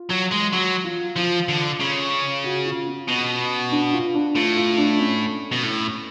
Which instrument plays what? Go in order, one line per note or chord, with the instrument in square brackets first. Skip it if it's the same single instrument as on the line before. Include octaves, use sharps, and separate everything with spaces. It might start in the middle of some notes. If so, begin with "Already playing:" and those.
Already playing: [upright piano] F4
[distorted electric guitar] F#3
G#3
[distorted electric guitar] F#3 [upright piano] F#4
[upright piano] F4
[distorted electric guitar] F3 [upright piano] F4
[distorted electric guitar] D3
C#3
[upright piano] F#4
F4
C#4
[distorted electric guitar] B2
[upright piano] D4
F4
D4
[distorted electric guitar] A2 [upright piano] F4
[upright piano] F4
D4
C#4
[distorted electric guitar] B2
A2